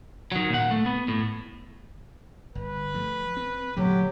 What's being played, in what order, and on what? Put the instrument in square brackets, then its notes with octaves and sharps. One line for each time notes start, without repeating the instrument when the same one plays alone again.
[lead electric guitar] D#3 F#3
A#2 F#5
A3
B3
A2
[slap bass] G1 [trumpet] B4
[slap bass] F3 A3
C4
[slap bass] A#2 D3 A3 [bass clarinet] F#3 [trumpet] G4